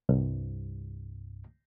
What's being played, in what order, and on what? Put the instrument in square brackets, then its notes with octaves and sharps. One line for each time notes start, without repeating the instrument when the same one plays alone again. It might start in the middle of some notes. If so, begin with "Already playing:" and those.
[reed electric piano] C2 G2